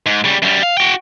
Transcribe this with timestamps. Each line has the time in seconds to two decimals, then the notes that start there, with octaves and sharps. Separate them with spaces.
0.06 G#2
0.24 C#3 G3
0.42 F#2 G3
0.63 F5
0.77 F#4 G5